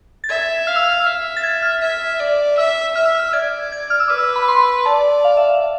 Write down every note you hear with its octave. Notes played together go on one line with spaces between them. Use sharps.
A6
E5 G#6
F5 F6
E6
F6
E5
A6
G#6
F6
E5
D5
E5 E6
E5 F6
E6
F6
D5 G#6
G#6
F6
E6
B4 D6
E6
B5
C6
D5 A5
F5
E5
F5